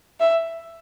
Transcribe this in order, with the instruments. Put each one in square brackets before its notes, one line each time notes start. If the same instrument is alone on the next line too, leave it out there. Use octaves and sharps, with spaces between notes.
[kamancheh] E5